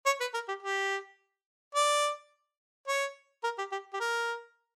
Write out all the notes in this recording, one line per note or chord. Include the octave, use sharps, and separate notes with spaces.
C#5
B4
A#4
G4
G4
D5
C#5
A#4
G4
G4
G4
A#4